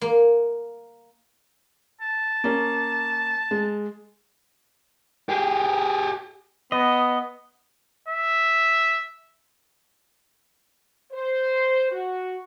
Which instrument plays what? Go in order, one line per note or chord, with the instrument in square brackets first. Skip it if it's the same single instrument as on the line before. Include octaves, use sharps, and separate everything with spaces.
[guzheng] A#3
[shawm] A5
[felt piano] A#3 C#4
G#3
[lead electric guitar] G4 G#4
[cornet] B3 [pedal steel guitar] D#5
[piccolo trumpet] E5
[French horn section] C5
F#4